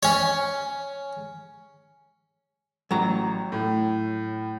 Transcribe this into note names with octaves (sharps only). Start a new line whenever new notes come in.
C#4 C#5
A1 F#3 A#5
A2